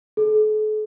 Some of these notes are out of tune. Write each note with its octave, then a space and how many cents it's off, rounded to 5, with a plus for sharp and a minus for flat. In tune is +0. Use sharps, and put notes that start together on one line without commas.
A4 -45